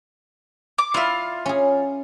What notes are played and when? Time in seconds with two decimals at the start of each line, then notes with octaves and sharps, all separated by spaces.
0.78 D6
0.94 E4 F4 D5 E5 F5
1.46 C#4 G#4